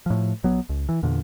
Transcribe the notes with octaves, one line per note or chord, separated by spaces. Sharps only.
A2 F3
A#1 F#3 B3
C#2
E3
E2 A#2 D3